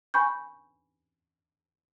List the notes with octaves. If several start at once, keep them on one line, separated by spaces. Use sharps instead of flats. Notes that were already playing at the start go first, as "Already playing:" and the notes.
G#5 B5 C#6 G6